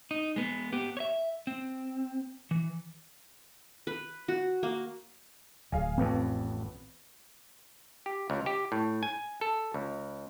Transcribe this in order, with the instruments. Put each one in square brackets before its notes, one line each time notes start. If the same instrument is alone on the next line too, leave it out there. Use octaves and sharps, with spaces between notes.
[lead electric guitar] D#4
G#3 B3
B3 G4
C#5 E5
C4
E3
[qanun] B4
F#4
A#3
[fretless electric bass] D1 [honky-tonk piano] G#4 F5 G#5
[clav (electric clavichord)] A1 F2 [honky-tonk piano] B3 [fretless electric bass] C4
[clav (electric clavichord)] G4
C#2
G4
A2
G#5
A4
C#2